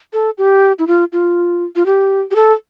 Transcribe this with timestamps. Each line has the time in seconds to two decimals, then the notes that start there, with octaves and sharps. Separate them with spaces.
0.13 A4
0.38 G4
0.79 E4
0.87 F4
1.12 F4
1.76 F4
1.86 G4
2.31 G4
2.36 A4